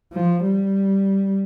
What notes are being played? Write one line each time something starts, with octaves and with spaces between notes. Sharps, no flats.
F3
G3